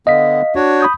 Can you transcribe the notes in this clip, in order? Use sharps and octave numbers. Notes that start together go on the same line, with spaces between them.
D3 B3 D#5 F5 B6
D4 F#4 C#5
B5 D#6 G6